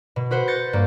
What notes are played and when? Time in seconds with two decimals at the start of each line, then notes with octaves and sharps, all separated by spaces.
0.16 B2
0.31 F#4 B4 C5 F#5
0.47 G6 A6 A#6 C#7
0.73 G2 A#3